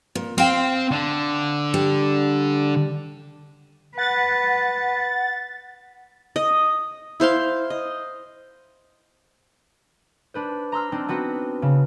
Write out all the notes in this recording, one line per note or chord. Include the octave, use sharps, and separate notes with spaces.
A#2
C4 F5 G5
D3
G3
B4 F#5 A6
D#5
E4 C5 F5 C6
D#5
D4 B4 C5
A#5 C6 E6 F6
C4 D4 D#4
B3 C4 F#4 B4
C#3